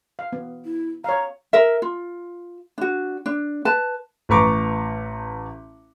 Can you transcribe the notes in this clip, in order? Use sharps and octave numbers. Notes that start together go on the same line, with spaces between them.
F5
B3
E4
C#5 F5 A#5
A#4 E5
F4
D4 F#4
D4
B4 A5
A1 A3 B4 A#5 C#6 D6